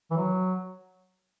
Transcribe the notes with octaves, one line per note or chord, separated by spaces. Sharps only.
E3
F#3